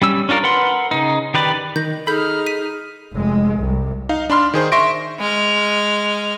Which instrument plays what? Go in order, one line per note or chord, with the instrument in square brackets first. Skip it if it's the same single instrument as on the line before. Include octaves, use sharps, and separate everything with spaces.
[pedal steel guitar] G3 C#4 E6
C#4 D4 F4 A#4
A#4 B4 F#5 C6
C#3 D#4
D#3 G4 B4 D5
[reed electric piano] D#3 [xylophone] G6 A#6
[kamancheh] D#4 F6 [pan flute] G#4 [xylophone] A4 G6 [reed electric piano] B5
[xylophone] B6 D#7
[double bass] F1 G#3
C2
[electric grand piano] D#4 F5
D4 B5 C6 F6
D#3 G#4 C5
E5 C6 C#6 A#6 D7
[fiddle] G#3 F6